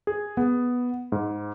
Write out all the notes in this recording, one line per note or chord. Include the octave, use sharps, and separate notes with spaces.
G#4
B3
G#2